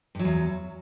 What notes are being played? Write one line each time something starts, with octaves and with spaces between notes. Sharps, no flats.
E2 G2 F#3